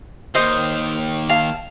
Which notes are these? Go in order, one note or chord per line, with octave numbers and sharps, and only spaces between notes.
D#2 D#3 C5 D#5 D#6
F5 A5